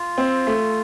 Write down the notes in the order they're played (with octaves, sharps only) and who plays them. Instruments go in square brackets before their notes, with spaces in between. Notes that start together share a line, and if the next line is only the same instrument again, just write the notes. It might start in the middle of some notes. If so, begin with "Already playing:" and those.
Already playing: [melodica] F4
[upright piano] C4
A3